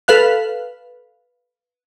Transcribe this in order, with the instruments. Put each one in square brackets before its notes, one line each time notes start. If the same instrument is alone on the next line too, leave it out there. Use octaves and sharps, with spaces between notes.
[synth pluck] A4 B4 F5 F#6